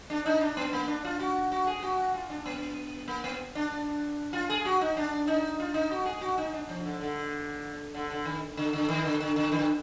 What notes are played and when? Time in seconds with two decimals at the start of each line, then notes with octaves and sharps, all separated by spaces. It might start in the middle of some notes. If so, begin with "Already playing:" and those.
0.10 D4
0.26 D#4
0.41 D4
0.57 B3
0.73 A#3
0.88 D4
1.05 F4
1.19 F#4
1.52 F#4
1.67 G#4
1.82 F#4
2.14 F4
2.30 D4
2.46 B3
3.08 A#3
3.24 B3
3.55 D4
4.33 F4
4.50 G#4
4.65 F#4
4.81 D#4
4.97 D4
5.27 D#4
5.60 F4
5.74 D#4
5.91 F#4
6.06 G#4
6.21 F#4
6.38 D#4
6.53 D4
6.69 F3
6.84 D3
7.01 D3
7.95 D3
8.10 D3
8.25 D#3
8.57 D3
8.73 D3
8.88 D#3
9.05 D3
9.20 D3
9.36 D3
9.52 D#3
9.59 D3